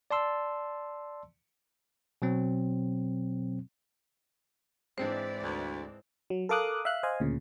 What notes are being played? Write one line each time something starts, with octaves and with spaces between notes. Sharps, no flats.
D5 A5 C6 E6
B2 F#3 C4
G#2 E3 G#3 C4 D4 C5 D5
D2
F#3
A4 A#4 F5 D6 D#6 F#6
E5 F5 F#6
C5 D#5 F5 G#5
D2 A#2 C#3